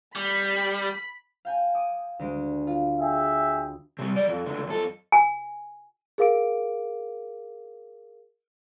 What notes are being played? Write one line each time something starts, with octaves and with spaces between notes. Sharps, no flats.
G3 B5
F5 G5 G#5
D6 D#6
D2 G#3 D7
F4
G#4 E5 G5
C3 G3
F#3 D5
F2
C#2 D3
F#2 A4
G#5
G#4 A#4 F5 D6 D7